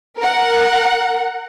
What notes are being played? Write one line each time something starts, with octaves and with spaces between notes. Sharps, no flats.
A#4 F#5